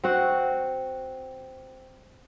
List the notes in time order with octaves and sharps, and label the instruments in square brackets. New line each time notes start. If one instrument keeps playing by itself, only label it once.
[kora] C4 F#4 F#5